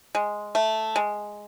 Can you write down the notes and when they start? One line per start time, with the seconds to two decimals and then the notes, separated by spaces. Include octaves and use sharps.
0.15 G#3
0.55 A3
0.96 G#3